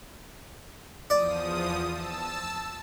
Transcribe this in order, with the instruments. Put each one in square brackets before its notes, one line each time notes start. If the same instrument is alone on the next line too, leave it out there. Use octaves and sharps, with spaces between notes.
[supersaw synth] E2 F3 D#6 [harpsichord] D5
[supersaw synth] A5 E6